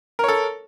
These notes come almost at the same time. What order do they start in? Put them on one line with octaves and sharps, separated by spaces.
A#4 C#5 A4